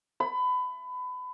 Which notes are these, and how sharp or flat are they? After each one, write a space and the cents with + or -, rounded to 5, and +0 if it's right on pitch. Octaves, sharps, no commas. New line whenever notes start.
B5 +25